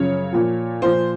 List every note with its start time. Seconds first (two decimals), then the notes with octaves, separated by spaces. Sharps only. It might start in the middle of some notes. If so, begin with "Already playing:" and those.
Already playing: F#2 C#3 F3 C#5
0.33 A#2 F3
0.82 A#2 F3 C5